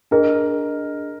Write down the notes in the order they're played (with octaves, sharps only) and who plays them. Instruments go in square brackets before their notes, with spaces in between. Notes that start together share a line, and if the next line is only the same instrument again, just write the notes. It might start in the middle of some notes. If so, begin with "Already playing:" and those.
[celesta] D4 G#4 D#5 [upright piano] A#4